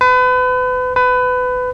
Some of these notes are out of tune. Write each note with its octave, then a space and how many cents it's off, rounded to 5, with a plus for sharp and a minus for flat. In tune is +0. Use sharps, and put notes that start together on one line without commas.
B4 +35
B4 +25